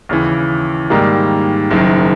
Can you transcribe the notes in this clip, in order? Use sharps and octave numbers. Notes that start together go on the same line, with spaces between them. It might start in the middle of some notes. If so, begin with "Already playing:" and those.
D#2 C#3 E3
G#2 D#3 G3 A#3
F#1 F#2 D#3